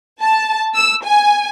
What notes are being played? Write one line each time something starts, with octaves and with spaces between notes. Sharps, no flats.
A5
E6
G#5